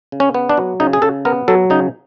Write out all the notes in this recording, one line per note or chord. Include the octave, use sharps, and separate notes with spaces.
C#3
C#4
B3
D4
F#3
C#3 D#4
G#4
C#3 A4
B3 A#4
F#3 A4
C#3 D#4